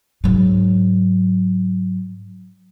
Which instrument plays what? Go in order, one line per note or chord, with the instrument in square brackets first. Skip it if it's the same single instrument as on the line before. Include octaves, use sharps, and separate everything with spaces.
[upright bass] G#2 F#3